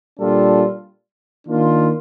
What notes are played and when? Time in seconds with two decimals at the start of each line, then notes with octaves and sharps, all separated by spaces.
0.19 A#2 G3 D4 F4 A4
1.46 D#3 A#3 D4 F4